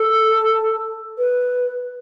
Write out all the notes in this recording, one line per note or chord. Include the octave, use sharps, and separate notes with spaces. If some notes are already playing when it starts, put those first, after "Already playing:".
Already playing: A4
B4